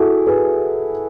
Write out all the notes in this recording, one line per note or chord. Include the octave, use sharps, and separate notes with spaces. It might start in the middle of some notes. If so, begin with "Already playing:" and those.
Already playing: E4 F#4 G#4 A4
G#4 B4